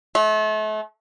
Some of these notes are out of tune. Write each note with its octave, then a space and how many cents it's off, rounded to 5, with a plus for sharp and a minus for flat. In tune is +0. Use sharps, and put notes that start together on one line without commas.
A3 -35